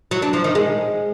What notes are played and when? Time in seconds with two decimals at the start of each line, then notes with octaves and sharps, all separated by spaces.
0.11 F#3
0.22 D4
0.33 F3
0.44 D#3
0.55 G#3